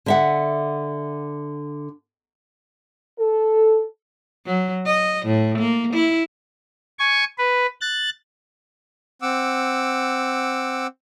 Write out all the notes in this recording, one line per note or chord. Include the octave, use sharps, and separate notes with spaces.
D3 E5 F#5
A4
F#3
D#5
A2
A#3
E4
G#5 C#6
B4
F#6 A6
C4 F#5 D6 E6